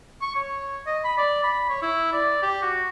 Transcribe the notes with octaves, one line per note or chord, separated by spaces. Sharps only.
C#6
C#5
D#5
B5
D5
B5
C#5
E4
D5
G4
F#4